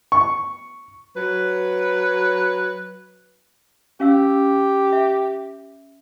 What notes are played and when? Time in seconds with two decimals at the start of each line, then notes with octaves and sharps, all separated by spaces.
0.12 C#6
1.17 F#3 B4
4.00 C#4 G4 F5 E6
4.93 E5